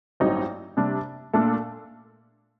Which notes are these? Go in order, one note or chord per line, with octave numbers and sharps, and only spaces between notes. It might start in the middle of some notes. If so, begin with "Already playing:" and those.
A1 G2 F#3 C4 D#4
C3 G3 D4
A#2 A3 D4 A4